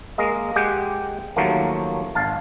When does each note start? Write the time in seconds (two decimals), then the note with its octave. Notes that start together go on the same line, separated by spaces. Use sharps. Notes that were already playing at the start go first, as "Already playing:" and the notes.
0.18 G#3 A#3 D#5
0.56 G#3 G4 F#5 G5
1.36 D#2 F3 F#3 A3 A#3
2.15 G#1 F5 A5